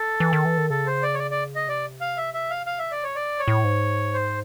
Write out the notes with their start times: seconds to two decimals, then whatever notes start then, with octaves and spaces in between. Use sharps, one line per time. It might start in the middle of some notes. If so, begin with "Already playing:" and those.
Already playing: A4
0.20 E3
0.33 D#3
0.45 E3
0.58 D#3
0.70 C#3 A4
0.86 C5
1.03 D5
1.14 C#5
1.19 D5
1.31 D5
1.55 D#5
1.67 C3 D5
2.01 F5
2.17 E5
2.34 E5
2.50 F5
2.66 F5
2.79 E5
2.91 D5
3.03 C#5
3.15 B2 D5
3.32 A2
3.39 C#5
3.48 A2
3.64 G#2
4.14 C5